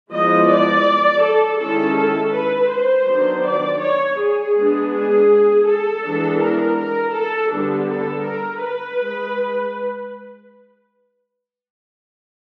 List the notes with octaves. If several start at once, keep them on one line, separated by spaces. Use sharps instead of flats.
F3 G#3 B3 E4 D#5
D5
A4
D#3 G#3 C#4 E4 A4
A4
B4
C5
D#3 F#3 B3 D4
D5
C#5
G#4
G#3 B3 D4
G#4
A4
E3 G#3 B3 D4
A#4
A#4
A4
D3 G3 B3 D4
A4
A#4
B4
G#3